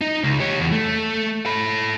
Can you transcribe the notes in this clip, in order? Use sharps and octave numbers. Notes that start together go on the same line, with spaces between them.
D#4
C#2
G4 C#5
E2
A3
A4 B5